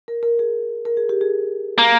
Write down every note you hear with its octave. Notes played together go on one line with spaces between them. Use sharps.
A#4
A#4
G#4
A#4
G#4
G4
G#4
A#3